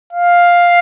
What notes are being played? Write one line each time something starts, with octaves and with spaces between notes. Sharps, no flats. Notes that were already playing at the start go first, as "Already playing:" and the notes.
F5